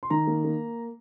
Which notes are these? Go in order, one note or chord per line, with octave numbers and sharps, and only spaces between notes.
C6
D#3 A#5
A#3
A#3